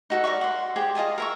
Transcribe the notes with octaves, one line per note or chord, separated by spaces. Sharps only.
D#4 F#4 A4
A#4 D5 E5 C#6
F#5 C6
G4 G#4 C5
F4 D#5 G#5 A5
A#4 E5 C#6